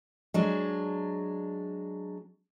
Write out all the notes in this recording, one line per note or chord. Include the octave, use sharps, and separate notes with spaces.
F#3 G#3 D4